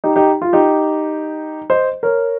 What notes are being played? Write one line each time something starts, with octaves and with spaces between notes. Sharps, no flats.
D#4 G4
D#4 G4
F4
D#4 G4
C5 D#5
A#4 C#5